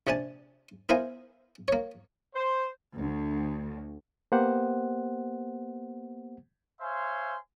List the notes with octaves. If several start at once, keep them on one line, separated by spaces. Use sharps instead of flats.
A#1 C3 D4 G#5 A5
B3 E4 A#4 C5 F5 G#5
A#3 C#5
C5
D2
A#3 B3 G4 C5 F#5
C5 C#5 E5 F5 G#5 C6